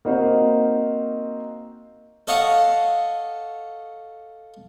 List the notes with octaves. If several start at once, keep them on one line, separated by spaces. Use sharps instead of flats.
A#3 C4 D#4 F#4 C5
A4 C#5 D#5 F5 F#5